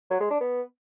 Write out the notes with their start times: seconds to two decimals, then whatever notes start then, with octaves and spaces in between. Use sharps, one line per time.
0.10 F#3
0.20 G#3
0.30 D4
0.40 B3